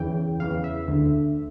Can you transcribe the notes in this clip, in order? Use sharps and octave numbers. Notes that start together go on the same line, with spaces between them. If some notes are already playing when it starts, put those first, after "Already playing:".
Already playing: E2 C#3 E3 G5
E2 C#3 E3 F5
E5
D2 D3